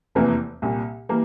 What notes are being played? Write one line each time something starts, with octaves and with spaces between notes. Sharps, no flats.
F1 E2 C3 E3 A#3
C2 A#2 G3
E3 G3 A#3